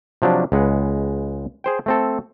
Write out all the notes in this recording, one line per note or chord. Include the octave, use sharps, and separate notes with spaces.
C3 F3 F#3 D4
C#2 G#3 B4 F#5
G#4 C5 G5
A3 C4 A4